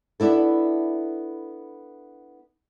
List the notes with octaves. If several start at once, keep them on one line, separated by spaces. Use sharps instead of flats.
B3 D4 E4 A4